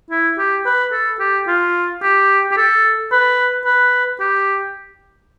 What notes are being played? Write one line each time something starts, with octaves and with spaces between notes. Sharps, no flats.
E4
G4
B4
A4
G4
F4
G4
G4
A4
B4
B4
G4